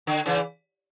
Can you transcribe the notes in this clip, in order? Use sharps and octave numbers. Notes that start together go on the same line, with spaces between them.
D3
C#3 E3